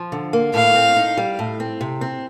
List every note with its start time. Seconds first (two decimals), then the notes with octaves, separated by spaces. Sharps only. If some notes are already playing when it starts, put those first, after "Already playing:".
Already playing: F3
0.12 D3
0.33 A#3
0.54 A2 F5
0.75 C4
0.97 D#4
1.17 G3
1.39 A2
1.60 C4
1.81 C3
2.01 C4